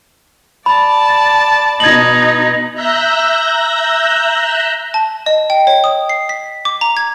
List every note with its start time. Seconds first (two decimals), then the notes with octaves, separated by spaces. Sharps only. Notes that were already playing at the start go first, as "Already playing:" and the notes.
0.66 D5 A5 B5
1.80 B2 D#4 G#6 F#7
2.74 E5 A#5 E6 F#6 G6 A#6
4.94 A5
5.26 D#5
5.50 G5
5.67 C#5
5.84 D#6
6.09 C7
6.29 B6
6.65 D6
6.81 A#5
6.97 G#6